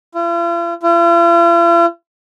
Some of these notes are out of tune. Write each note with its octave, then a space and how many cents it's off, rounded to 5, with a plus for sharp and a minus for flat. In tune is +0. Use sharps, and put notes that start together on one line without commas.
F4 -45
F4 -45